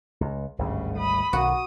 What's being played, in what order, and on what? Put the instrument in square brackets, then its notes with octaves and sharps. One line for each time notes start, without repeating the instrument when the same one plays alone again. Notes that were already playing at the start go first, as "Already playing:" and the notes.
[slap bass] C#2
[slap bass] G#1 D2 G3 [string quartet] G2 C#3
[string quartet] B5 D#6
[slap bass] B1 D#3 [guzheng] F#4 [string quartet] D#6